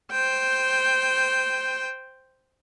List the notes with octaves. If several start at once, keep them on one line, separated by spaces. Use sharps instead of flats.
C5 G5